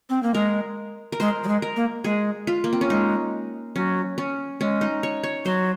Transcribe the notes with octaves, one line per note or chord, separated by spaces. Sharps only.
C4
A#3
G#3 A#4
A#4
G#3 C5
F#3
G#3
A#4
A#3
G#3 G#4
F4
A#3
C4
C#4
G#3 D#4
F#3 C#4
C#4
G#3 C#4
D#4
C#5
C#5
F#3 C5